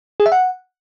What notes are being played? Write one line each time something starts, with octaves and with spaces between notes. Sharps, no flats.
G#4
E5
F#5